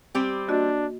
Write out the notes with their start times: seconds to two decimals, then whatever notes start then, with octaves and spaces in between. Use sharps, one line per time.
0.15 G3 C4 G4
0.48 A#3 D4 F#4 D#5